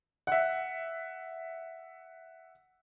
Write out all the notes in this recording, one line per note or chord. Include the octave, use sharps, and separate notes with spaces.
E5 F#5